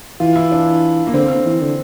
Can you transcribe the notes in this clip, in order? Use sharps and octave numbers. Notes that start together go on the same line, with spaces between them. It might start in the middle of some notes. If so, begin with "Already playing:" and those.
E3 F4
E4
D4
A#3
D3 C4
E3
D3